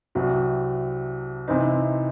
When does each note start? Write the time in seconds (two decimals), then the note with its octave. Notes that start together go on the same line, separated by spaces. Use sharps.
0.15 C2 C3 F#3
1.48 C3 E3 C4 D#4